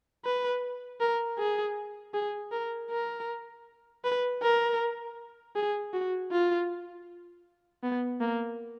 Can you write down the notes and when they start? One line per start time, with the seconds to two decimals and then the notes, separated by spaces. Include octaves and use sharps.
0.25 B4
1.00 A#4
1.39 G#4
2.14 G#4
2.52 A#4
2.90 A#4
4.04 B4
4.42 A#4
5.55 G#4
5.94 F#4
6.32 F4
7.83 B3
8.21 A#3